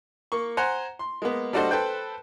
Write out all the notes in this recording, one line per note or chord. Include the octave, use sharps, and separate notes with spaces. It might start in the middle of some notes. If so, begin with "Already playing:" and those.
A#3 C#6
C5 F#5 G#5 A#5
C6
G#3 A#3 B3
G3 D4 F#4 A4 C5 D#5
A4 B4 C5 G5